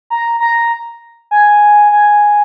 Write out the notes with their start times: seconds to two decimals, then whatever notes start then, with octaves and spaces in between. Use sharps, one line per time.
0.10 A#5
0.40 A#5
1.31 G#5
1.92 G#5